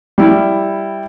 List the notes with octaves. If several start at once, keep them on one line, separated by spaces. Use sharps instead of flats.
G3 E4